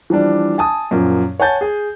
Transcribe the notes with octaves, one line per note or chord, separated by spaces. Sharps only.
E3 F3 G3 D4
G#5 A5 D#6
F#2 A#2 F3
C#5 F#5 G#5 A5 G6 A6
G#4 G#5